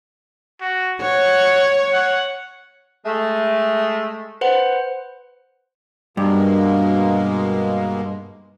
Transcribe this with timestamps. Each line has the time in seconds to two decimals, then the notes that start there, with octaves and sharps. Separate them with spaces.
0.60 F#4
1.01 C#5 F#5
1.93 F#5
3.05 G#3 A3
4.41 B4 C5 F#5
6.17 G2 B2 G#3 A#3